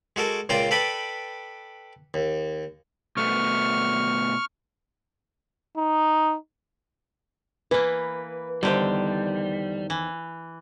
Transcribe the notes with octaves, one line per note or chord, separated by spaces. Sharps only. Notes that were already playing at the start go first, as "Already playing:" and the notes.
G#3 F#4 A4 A#4
C#2 A#2 F4 D5 G5 A#5
A4 B4 D5 G5 B5
D#2
B2 A3 B3 C#6 F6
D#4
E3 A#3 B4
E2 D3 D#3 G3 G4 C5
E3